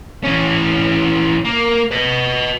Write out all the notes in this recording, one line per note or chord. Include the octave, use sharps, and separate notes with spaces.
E3 C#4
A#3
B4 D#5